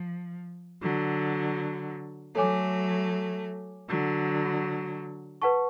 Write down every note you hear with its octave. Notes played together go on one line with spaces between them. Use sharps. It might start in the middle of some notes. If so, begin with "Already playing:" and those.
Already playing: F3
D3 F#3
F#3 A3 A4 C#5 G#5 D6
D3 F#3
B4 F#5 A5 C#6